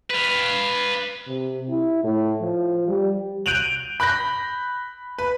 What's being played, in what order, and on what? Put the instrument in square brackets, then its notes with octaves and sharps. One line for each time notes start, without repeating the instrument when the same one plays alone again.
[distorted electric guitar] B4 F5
[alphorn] C3
E4
A2
F3
G3
[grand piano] F#6 G6 D7 D#7 F7 F#7
B5 F#6 G6 A#6
B4